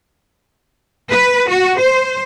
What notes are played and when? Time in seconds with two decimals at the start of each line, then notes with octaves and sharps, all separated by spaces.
1.11 B4
1.49 F#4
1.80 C5